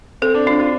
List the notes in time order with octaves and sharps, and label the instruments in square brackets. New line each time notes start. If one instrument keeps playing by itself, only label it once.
[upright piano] C4 [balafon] A4
[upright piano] D4
[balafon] D4 [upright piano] F4
[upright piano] F4